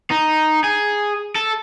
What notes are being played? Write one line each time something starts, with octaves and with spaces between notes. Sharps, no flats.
D#4
G#4
A4